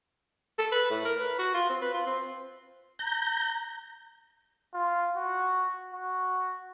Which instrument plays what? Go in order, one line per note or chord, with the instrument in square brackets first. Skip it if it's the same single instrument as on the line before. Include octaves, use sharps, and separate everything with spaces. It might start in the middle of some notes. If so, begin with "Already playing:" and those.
[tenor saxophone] A4
B4
A2
A#4
B4
F#4
F4
C4
B4
F4
C4
[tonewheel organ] A#5 G6
[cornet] F4
F#4
F#4